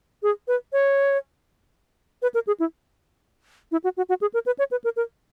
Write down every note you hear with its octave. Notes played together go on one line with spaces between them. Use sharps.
G#4
B4
C#5
B4
A#4
G#4
E4
E4
F#4
F#4
F#4
G#4
A#4
B4
C#5
B4
A#4
A#4